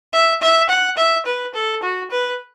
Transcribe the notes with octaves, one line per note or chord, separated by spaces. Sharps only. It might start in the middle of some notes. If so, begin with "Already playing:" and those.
E5
E5
F#5
E5
B4
A4
F#4
B4